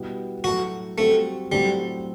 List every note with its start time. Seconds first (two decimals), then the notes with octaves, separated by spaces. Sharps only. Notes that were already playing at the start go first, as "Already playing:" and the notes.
Already playing: B2 G3 B3 E4
0.44 A2 F#3 A3 F#4
0.98 G3 A3 C4 F#4
1.52 A2 F#3 G3 A3 C4